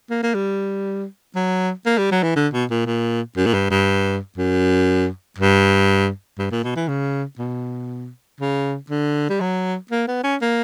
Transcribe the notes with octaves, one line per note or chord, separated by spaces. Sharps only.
A#3
A#3
G3
F#3
A#3
G3
F#3
E3
D3
B2
A#2
A#2
F#2
A#2
G2
G2
F#2
G2
G2
A#2
B2
E3
C#3
B2
C#3
D3
G3
F#3
A#3
B3
C#4
A#3